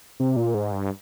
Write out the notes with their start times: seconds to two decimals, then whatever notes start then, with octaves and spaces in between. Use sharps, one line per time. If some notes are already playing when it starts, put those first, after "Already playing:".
0.20 C3
0.36 A#2
0.54 G#2
0.72 G2